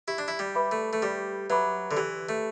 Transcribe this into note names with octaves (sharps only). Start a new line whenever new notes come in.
E4 G4
D4
E4
G3
B4 E5 B5 D6
A3
A3
G3 G4
F#3 B4 E5 B5 D6
D3
E3 G4
A3